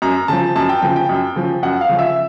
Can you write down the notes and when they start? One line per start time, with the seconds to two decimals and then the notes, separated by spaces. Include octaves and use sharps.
0.02 F#2 A#5
0.28 C#3 F3 A5
0.56 F#2 A5
0.69 G5
0.82 C#3 F3 G5
0.96 G5
1.09 F#2
1.36 C#3 F3
1.63 F#2 F#5
1.81 F5
1.89 C#3 F3
1.99 E5